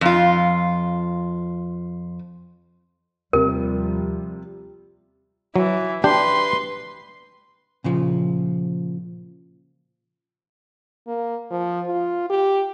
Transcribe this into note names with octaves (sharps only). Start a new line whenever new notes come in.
F2 F4
D#2 C3 F3 G3 A#4
E3 F#3
D4 G4 B4 C6
A#2 C#3 F3
A#3
F3
F4
G4